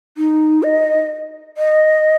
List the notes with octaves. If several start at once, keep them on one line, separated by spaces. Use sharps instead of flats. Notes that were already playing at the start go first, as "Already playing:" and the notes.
D#4
D#5
D#5